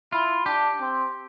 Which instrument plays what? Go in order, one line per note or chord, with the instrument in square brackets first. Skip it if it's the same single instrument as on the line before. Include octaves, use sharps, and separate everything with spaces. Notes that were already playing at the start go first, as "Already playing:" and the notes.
[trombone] E4 [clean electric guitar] F4
[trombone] D4 [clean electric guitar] G4
[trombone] C4